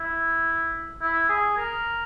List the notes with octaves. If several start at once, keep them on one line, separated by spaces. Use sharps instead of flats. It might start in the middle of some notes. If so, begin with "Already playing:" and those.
Already playing: E4
E4
G#4
A#4